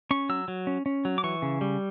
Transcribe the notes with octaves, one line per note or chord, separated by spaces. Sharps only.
C#4 C#6
F#3 E6
F#3
C#4
C#4
F#3
D6
E3 C#6
C#3
G3